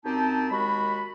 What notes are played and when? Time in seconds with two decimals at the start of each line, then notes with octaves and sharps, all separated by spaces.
0.05 F#2 C4 D#4 G4 A5
0.50 D#2 G#3 F#4 B5